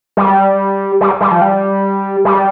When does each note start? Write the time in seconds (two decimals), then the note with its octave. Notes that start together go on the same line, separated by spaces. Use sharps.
0.17 G3
1.01 G3
1.21 G3
1.31 F3
1.41 G3
2.25 G3